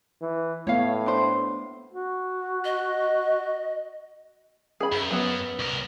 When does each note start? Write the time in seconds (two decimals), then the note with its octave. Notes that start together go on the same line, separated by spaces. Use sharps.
0.21 E3
0.67 A2 A3 B3 C#5 F5
1.06 D4 C5
1.93 F#4
2.65 D#5
4.80 G#4 B5
4.92 F#2
5.11 F#3 B3
5.59 C2 A#4